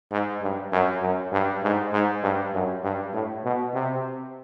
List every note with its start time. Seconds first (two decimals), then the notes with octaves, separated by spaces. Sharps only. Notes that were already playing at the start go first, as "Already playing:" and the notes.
0.11 G#2
0.42 G2
0.72 F#2
1.02 F#2
1.32 G2
1.63 G#2
1.93 G#2
2.23 G2
2.54 F#2
2.84 G2
3.14 A2
3.45 B2
3.74 C3